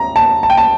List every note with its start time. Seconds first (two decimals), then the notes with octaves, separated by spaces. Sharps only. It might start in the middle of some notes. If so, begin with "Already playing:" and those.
Already playing: A#5
0.16 A5
0.43 A5
0.50 G5
0.58 A5